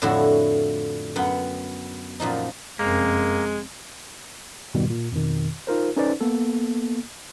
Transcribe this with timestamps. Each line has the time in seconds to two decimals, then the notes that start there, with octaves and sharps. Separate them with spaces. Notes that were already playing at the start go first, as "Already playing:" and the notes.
0.02 F2 A2 D3 E4 F#4
1.16 F#2 B3 F#5 G5
2.20 F#2 A#2 F3 D#4
2.79 F1 F#2 G#3 A#3 C4
4.74 F2 G#2 B2 D#3 G3
4.90 A#2
5.12 F2 B2 D#3
5.67 D#4 F4 A#4 C5
5.96 C#4 D#4 A4 B4 C5 D5
6.21 A#3 B3 A4